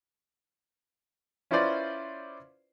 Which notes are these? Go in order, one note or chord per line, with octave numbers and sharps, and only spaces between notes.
C#4 E4 F4 B4 C5 D5